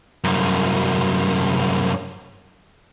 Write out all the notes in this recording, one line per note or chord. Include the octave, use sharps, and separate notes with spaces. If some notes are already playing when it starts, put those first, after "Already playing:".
C2 F#2